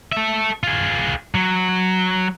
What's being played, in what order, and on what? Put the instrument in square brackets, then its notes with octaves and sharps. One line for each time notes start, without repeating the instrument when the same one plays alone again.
[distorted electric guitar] A4 E5
F4 G#4
F#3